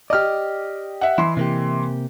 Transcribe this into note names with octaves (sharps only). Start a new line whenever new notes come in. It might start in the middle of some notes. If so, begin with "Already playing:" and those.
G4 D5 D#5 F6
E5 F#5
E3 E4 C6
C3 A#3 G4